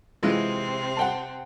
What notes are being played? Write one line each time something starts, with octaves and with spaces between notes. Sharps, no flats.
C3 E3 G#3 C4 F4
F#5 G5 A5